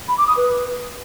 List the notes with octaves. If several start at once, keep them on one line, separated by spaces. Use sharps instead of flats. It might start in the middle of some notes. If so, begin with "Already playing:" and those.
B5
D6
D#6
B4